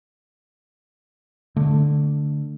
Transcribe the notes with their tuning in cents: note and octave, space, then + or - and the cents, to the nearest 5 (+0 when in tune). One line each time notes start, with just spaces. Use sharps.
D3 +0 A3 +0